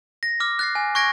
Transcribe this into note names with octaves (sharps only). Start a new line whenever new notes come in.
A#6
D6 F6
F#6 A6 C7
G#5
C#6 F#6 G#6 A#6 D7